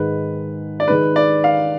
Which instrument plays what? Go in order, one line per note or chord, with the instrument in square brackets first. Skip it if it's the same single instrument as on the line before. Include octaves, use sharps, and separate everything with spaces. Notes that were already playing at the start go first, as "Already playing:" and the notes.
Already playing: [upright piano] G#2 D#3 G#3 [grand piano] B4
[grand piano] D5
[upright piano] D#3 G#3 D#4 [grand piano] B4
[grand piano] D5
F5